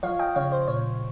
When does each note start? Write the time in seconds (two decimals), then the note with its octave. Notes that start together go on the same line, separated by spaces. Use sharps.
0.03 F3 C#5 F5
0.19 D#5 G5
0.35 C#3 C#5 F5
0.52 C5
0.68 A#2 C#5